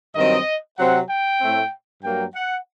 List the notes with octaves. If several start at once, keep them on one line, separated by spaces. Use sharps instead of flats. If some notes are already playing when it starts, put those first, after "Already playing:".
G2 D#3 F#3 C4 D#5
C3 F#3 C4 F#5
G5
A2 A3 C4
G2 F#3 A#3 G5
F#5